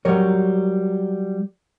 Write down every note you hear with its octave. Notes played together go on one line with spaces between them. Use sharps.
F#3 G3 A#4 C#5